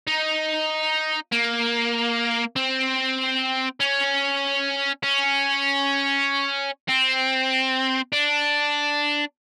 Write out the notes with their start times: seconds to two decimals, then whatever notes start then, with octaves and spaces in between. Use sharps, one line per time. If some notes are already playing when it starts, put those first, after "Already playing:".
0.07 D#4
1.32 A#3
2.56 C4
3.80 C#4
5.03 C#4
6.89 C4
8.13 D4